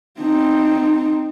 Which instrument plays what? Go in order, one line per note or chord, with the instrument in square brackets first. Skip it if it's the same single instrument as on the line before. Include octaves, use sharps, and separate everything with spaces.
[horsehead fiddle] C4 D#4